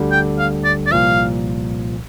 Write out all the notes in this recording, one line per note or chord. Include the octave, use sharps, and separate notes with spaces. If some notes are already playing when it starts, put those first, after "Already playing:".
Already playing: D2 D3 G3
G5
F5
D5
D5
C2 A#2 F3 F5